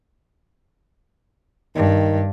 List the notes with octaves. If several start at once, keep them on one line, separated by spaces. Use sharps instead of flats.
G2 D#3